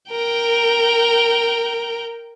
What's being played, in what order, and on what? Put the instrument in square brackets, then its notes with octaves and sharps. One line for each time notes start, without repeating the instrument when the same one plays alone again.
[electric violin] A#4 G5